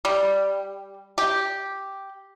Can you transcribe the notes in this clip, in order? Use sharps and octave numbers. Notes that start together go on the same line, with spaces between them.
G3
G4